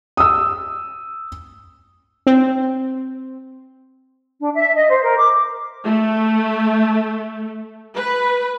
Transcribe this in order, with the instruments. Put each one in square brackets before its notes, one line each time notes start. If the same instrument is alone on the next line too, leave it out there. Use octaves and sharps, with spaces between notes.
[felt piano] D#6 E6
[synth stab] C4
[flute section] D4
E5
D#5
C5
A#4
D6
[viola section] A3
B4